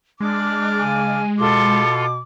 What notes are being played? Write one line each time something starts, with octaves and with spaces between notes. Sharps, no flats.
G#3 D4 D6 F6
C#3 G#5
B2 F4 A4 C6 D6